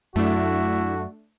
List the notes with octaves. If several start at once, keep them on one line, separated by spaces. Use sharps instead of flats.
F#2 A3 D4 E4 F#4